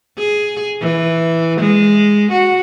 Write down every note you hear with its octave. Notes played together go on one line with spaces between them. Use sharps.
G#4
E3
G#3
F#4